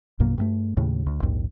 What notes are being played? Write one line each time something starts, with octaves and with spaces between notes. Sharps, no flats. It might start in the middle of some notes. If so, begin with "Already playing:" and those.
A#1 F#2 B2 A#3
G2 G3 A3
D#2 A2 C#3
D2
A#1 D#2 G#2